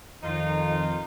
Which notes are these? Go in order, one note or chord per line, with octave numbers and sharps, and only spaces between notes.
F2 D#3 D#4 F4 C5